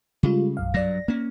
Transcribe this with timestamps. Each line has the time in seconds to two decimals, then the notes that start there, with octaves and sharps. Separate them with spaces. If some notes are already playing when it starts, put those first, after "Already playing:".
0.23 C#3 G3 G#3 F4
0.57 B1 F#2 F5
0.74 G2 F#3 D5 A#6
1.08 A#3 C#4